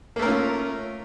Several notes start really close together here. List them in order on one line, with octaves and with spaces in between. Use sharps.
A#3 A3 A#4 C#4 F4